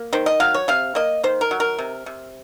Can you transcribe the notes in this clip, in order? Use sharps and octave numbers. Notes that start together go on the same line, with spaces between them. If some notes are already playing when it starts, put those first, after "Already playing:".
Already playing: A#3
D#3 C5
D#5
F#3 F5
C#5
C3 F5
A#3 D#5
D#3 C5
A#4
F#3
A#4
C3
C3